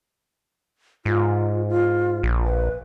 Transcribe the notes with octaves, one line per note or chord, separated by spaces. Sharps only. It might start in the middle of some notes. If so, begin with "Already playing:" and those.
G#2 F4
F4
A#1
B4